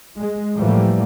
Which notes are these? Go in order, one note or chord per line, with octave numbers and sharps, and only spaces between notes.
G#3
A2 E3 F3 G3 A3 A#3